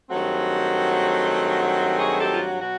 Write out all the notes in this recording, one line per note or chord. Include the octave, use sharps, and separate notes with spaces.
G2 D#3 F#3 A3 C4 F#4
F#4 G#4
G4 A4
F4
F#4
B2 F#3 F#4